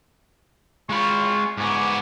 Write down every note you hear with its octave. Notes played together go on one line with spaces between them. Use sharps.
G#3 F4 B5 C#6
G#2 B3 G#5 C#6 D6